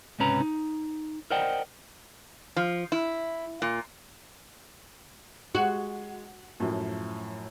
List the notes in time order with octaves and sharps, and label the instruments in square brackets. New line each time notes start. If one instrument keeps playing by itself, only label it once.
[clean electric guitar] C#2 G#2 C3 C#4 B4 A#5
D#4
A#4 C5 D5 D#5 F#5 G5
[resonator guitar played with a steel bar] F3
E4
A#2
[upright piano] G#3 [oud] F#4
[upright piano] F#2 A2 F3